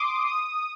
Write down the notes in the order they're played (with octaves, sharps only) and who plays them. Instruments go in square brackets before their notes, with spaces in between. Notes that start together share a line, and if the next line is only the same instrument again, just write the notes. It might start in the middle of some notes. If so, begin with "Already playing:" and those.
Already playing: [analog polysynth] C6 D6 D#6
D#6